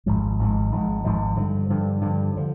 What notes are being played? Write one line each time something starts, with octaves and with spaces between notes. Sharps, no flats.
G#1 G#2 F3 G#3
G#1 G#2 F3 G#3
G#1 G#2 F3 G#3
G#1 G#2 F3 G#3
G2 D3 F3
G2 D3 F3
G2 D3 F3
D3 F3